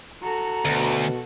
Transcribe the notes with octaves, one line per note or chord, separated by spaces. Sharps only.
F#4 A4 A#5
D2 B2